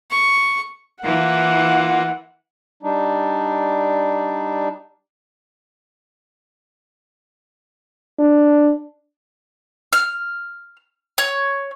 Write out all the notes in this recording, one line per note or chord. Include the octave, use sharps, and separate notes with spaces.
C#6
E3 A#3 F4 F#5
G3 D4 D#4
D4
F6
C#5